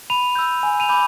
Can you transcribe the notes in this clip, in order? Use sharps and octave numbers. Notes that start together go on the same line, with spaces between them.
B5 D#7 F7
E6 G6
G#5
D#7 F7
B5 D6 G6